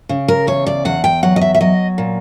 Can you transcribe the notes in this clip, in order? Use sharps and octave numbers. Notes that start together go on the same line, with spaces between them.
C#3
A#4
E2 C#5
D5
E2 F#5
G5
F#3 F#5
D#5
E5
E5
F#3 D#5
A#2